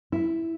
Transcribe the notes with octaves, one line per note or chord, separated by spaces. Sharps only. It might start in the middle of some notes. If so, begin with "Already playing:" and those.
E4